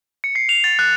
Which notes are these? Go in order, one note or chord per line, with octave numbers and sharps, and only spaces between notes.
C#7
C7
F7
A6
F#6